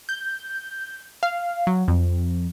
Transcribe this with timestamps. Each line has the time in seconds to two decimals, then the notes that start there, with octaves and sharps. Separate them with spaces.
0.09 G6
1.23 F5
1.67 F#3
1.88 F2